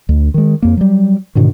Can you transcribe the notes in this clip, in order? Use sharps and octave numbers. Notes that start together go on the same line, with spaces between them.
D2
D#3 G#3
F2 A#3
F#3 G3
G#2 B2 D3 D#3